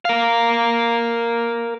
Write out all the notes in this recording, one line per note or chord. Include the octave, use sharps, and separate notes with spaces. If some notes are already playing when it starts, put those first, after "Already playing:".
A#4 F5